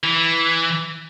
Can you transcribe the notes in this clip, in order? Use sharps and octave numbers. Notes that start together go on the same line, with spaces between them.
E3